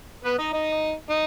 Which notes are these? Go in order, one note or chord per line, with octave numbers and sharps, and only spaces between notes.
B3 B4
D#4 D#5
D#4 D#5
D#4 D#5